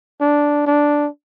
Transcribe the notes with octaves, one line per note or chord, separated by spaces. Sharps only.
D4
D4